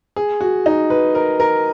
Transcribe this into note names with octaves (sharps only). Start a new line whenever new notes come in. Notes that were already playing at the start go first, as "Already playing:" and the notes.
G#4
F#4
D#4
B4
A#4
A#4